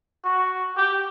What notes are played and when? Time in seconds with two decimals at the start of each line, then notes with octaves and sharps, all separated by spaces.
0.24 F#4
0.77 G4